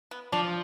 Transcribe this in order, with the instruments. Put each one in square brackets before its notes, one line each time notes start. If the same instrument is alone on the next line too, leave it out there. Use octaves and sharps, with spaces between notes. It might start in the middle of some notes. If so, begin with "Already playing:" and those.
[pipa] B3
[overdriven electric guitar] F3 [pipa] D4